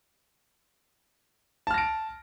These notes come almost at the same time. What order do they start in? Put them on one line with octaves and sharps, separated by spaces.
A5 F6 A#6 D7